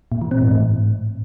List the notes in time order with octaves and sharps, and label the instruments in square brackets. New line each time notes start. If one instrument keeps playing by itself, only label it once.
[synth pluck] A#2
E3
C4
G#2
A2